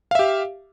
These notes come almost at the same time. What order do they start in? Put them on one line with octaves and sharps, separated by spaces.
F5 E5 G4